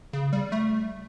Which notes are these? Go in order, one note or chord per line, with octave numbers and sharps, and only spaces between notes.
C#3
G3
A3